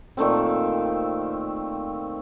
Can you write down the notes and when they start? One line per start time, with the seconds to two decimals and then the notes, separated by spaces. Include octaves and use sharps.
0.17 A#2 D#3 A3 C4